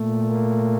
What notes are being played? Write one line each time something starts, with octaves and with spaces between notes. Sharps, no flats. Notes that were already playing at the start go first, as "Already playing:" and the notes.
Already playing: A#2 A3
A#3